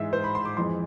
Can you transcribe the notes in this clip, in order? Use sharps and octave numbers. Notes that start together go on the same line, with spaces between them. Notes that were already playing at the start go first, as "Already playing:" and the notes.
Already playing: G#2 E3 G#3 E5
C5
B5
C6
D6
F2 E3 G#3 C6